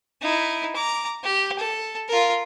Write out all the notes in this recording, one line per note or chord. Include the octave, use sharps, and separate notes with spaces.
D#4 E4
A#5 D6
G4
A4
F4 A#4